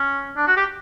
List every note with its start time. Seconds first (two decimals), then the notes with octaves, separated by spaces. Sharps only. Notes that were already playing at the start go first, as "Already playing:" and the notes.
Already playing: C#4
0.37 D4
0.47 F#4
0.57 G4